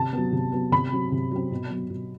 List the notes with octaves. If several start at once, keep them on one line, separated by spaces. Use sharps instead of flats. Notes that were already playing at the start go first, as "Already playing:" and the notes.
Already playing: C3 A5
F#3 B3
C3
F#3 B3
C3 B5
F#3 C4
C3
F#3 C4
B2
F#3 B3
B2